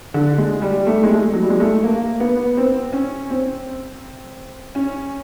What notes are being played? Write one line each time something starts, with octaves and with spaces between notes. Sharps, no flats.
D3
G#3
G3
A3
G#3
A3
F#3
G3
G#3
A3
A#3
B3
C4
C#4
C4
C#4